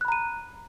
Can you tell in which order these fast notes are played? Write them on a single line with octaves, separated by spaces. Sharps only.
F#6 B5 A#5 D#7